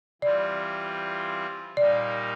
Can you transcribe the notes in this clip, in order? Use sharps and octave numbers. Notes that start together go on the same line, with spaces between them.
E3 G3 C4 F4 D5
A#2 G3 A#3 D#4 D5